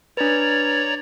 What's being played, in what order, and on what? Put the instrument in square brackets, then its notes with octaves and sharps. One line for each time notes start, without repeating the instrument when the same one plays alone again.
[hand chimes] D4 B4 [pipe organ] C#5 D5 A#5